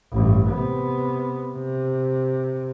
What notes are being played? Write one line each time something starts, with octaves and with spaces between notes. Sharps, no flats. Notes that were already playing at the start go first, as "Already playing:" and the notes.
A1 G2
C3 B3
C3